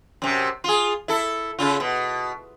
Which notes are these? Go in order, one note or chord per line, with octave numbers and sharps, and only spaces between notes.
F#2 C3
F4 G#4
E4 A4
C#3 F4
B2